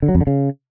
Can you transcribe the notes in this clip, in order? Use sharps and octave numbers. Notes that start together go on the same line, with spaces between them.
D3
F#3
F2
D3
C#3